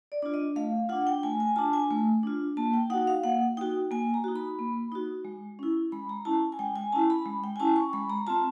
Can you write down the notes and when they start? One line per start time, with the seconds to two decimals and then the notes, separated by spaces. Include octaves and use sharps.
0.12 D5
0.22 D4 F4
0.34 D#5
0.56 A3 F5
0.89 F4 F#5
0.92 D4
1.07 G5
1.23 A3 G#5
1.40 G#5
1.56 D4 F4 A5
1.73 G#5
1.90 A3
2.23 D4 F4
2.57 A#3 A5
2.74 G5
2.90 D#4 F#5
2.94 F#4
3.07 F5
3.24 A#3 F#5
3.57 D#4 F#4 G5
3.91 A#3 G#5
4.14 A#5
4.24 D#4 F#4
4.36 B5
4.59 A#3
4.92 D#4 F#4
5.25 G#3
5.59 C#4 E4
5.92 G#3 B5
6.09 A#5
6.25 C#4 E4 A5
6.52 G#5
6.59 G#3 G5
6.76 G#5
6.92 C#4 E4 A5
7.10 B5
7.26 G#3
7.44 G5
7.56 G#5
7.60 C#4 E4 A5
7.76 C#6
7.93 G#3 B5
8.10 A#5
8.27 C4 F4 A5